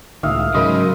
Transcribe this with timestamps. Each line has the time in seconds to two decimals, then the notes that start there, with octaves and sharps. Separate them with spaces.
0.23 C#2 A2 D#3 E5 F5 D#6
0.54 G#2 C#3 F#3 A#4 C5 D#5 B5